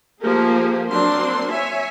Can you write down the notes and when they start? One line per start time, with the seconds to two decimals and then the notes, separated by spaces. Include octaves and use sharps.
0.21 F3 A3 A#3 G4 G#4 A#4
0.90 F#3 A#3 C4 D4 A#4 C6
1.51 C#5 E5 G#5